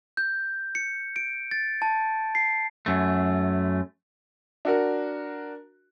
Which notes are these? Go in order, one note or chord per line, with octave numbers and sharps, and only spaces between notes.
G6
C#7
D7
A6
A5
C7
F#2 A3
D4 F#4 A#4